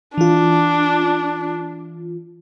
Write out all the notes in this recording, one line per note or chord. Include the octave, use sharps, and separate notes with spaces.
E3 D4 F4